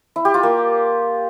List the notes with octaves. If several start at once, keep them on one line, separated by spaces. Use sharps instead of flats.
E4
G4
F4
A#3